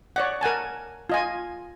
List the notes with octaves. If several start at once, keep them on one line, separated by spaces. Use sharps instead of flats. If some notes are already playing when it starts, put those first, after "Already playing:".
C#5 D5 F#5
A#4 F#5 G#5 A5
F4 D#5 G#5